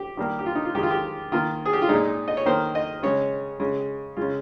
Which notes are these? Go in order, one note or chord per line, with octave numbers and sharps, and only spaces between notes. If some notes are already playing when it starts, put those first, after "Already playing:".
Already playing: G4
D#3 G3 A#3
G4
F4
D#4
F4
D#3 G#3 G4
F4
G4
D#3 A#3 F4
G#4
G4
F4
A#2 G#3 D#4
D#5
C#5
D#3 A#3 C5
D#5
C#3 G#3 C#5
C#3 G#3
C#3 G#3 F4